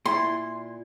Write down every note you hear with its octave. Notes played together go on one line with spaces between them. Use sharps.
A#2 E4 C6